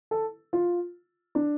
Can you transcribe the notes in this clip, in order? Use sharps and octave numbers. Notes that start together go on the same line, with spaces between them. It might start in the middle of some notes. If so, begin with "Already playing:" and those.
A4
F4
D4